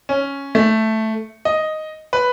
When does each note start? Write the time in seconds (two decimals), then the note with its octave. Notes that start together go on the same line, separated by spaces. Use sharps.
0.09 C#4
0.55 A3
1.45 D#5
2.13 B4